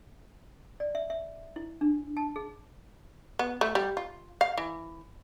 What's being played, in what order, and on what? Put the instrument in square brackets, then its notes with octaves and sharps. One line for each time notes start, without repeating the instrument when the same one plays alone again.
[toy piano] D5
E5
E5
E4
D4
A5
G#4
[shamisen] B3
A3
G3
F4
F5
E3